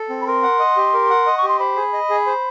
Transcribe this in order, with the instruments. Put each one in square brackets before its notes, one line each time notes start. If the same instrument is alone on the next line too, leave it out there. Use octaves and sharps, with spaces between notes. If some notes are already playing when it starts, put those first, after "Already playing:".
Already playing: [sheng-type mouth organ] A4
C4
[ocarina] B5
[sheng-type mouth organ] A#4 [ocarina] C6
[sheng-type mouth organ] F#5
D#5
G4
A#4
F#5
D#5
[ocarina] C#6
[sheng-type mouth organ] G4
[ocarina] C6
[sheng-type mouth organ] C5 [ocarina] B5
[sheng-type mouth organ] G#4
D#5
G#4
C5